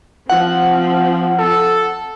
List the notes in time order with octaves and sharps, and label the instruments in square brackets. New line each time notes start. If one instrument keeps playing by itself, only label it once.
[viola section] F3 C4 [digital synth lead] F#5
[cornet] A4